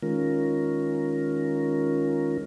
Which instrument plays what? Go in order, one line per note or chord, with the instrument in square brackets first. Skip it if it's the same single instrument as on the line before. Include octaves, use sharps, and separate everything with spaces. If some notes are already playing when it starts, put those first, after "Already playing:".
[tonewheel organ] D#3 G#3 C#4 F4 A#4